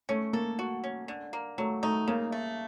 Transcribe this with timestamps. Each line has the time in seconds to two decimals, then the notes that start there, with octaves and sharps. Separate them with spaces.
0.09 A3 C#4
0.33 A#3 A4
0.59 F#4
0.84 C#4
1.08 D3
1.33 A#3
1.58 F#3 A3
1.83 A3 D#4
2.08 C#3 A#3
2.32 A3